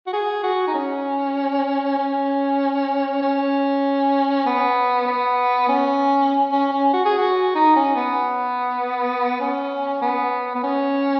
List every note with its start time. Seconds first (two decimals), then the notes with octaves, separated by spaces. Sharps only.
0.07 F#4
0.13 G#4
0.44 F#4
0.67 D#4
0.74 C#4
1.98 C#4
3.22 C#4
4.46 B3
5.07 B3
5.69 C#4
6.52 C#4
6.72 C#4
6.93 F#4
7.06 G#4
7.18 F#4
7.55 D#4
7.76 C#4
7.96 B3
9.41 C#4
10.02 B3
10.55 B3
10.63 C#4